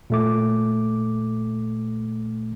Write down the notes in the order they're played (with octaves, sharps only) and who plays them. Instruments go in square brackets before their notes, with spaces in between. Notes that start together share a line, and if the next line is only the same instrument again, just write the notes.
[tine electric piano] A#2 A3 D6